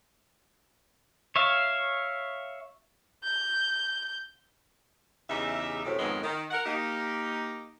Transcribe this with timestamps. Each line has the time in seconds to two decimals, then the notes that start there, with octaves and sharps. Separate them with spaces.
1.36 C#5 E5 F5
3.24 G6
5.30 E2 C#3 D#4 G4 E5
5.85 F#2 A2 C3
5.99 F2 G#2 D#3 F#3 G#3 B3
6.24 D#3
6.51 A#4 F#5
6.65 A#3 D#4 G4